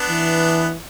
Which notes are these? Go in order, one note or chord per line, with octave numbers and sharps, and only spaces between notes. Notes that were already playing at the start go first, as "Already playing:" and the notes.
Already playing: B3 D4
E3